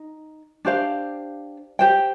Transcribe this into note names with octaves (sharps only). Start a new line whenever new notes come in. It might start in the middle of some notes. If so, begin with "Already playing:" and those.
Already playing: D#4
D4 G4 C5 F5
G4 C5 G5